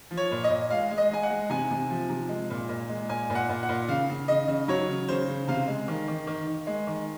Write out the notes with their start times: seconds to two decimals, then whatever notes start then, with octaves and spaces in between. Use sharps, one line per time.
0.11 F3
0.17 C#5
0.31 A#2
0.44 D#5
0.50 A#2
0.70 G#3 F5
0.91 G#3
0.98 D#5
1.10 G#3 G#5
1.23 F#5
1.30 G#3
1.50 C3 G#5
1.70 C3
1.90 F3
2.09 C3
2.29 G#3
2.50 A#2
2.69 A#2
2.89 G#3
3.09 A#2 G#5
3.30 A#2
3.35 F#5
3.49 A#2
3.63 F#5
3.69 A#2
3.88 C#3 F5
4.09 C#3
4.28 C#3 D#5
4.48 C#3
4.68 F#3 C#5
4.89 C#3
5.08 C#3 C5
5.28 C#3
5.48 C3 F5
5.67 G#3
5.88 D#3
6.08 D#3
6.27 D#3
6.47 D#3
6.67 G#3
6.87 D#3